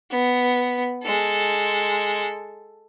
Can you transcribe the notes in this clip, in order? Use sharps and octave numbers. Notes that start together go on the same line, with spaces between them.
B3
G#3 A4